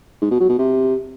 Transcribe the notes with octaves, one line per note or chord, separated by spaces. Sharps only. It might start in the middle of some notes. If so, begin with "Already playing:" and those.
G#2
B2
F#3
B2
C3